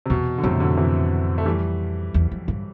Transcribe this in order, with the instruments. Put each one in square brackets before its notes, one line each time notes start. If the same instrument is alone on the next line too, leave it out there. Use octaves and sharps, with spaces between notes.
[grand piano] C3
[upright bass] E2 [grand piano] B2
[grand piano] D3
[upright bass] F2 [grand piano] A2 C3
[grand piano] B2 D3
C3 E3
A3
E3 G3
[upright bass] E2
F2
G2